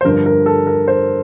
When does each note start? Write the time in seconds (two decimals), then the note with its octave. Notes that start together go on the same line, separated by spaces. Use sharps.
0.01 C5
0.04 G2 D3 F3 A#4
0.26 A#4
0.46 A4
0.67 A#4
0.88 C5